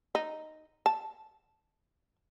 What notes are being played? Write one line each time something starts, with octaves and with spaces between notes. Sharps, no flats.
D#4
A5